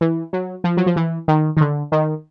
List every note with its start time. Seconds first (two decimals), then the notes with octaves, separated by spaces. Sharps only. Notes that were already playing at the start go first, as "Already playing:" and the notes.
0.01 E3
0.33 F#3
0.64 F3
0.77 F#3
0.86 F3
0.96 E3
1.28 D#3
1.57 D#3
1.61 D3
1.92 D#3